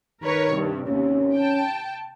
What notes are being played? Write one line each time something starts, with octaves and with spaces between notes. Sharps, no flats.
D#3 A#4 B4 C#5
G2 C3
D#2 C3 C#4
G5 A5